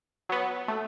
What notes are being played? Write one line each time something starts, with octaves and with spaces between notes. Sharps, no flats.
F#3 B3
A3